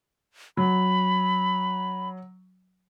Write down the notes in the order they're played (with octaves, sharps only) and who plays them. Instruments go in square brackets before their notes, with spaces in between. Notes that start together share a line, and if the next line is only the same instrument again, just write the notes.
[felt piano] F#3 [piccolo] B5